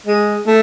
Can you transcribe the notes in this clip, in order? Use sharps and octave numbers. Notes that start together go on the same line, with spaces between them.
G#3
A3